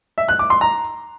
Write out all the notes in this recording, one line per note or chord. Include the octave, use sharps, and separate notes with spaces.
E5
F#6
D6
C6
A#5